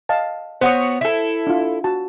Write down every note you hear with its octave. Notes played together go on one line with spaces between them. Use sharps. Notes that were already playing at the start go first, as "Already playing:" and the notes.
D#5 F5 A5
B3 F#4 C5 C#5 F#5 D#6
E4 A4
D4 F4
F#4 A5